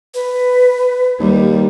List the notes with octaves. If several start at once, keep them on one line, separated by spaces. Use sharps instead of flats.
B4
D#2 G3